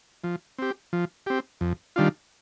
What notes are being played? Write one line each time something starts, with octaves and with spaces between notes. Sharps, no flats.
F3
C4 G4
F3
C4 G4
F2
D#3 G3 D4 F4